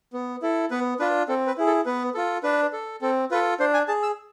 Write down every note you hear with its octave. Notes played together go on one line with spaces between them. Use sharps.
B3
E4 A4
B3 B4
D4 F4 B4
C4 A4
B4
E4 G#4
A4
B3 B4
F4 A4
D4 B4
A4
C4 A4
F4 A4 B4
D4 C5
G#5
G#4 A5
E6